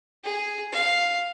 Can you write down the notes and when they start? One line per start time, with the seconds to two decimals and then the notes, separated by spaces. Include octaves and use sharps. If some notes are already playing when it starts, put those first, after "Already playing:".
0.24 G#4
0.72 F5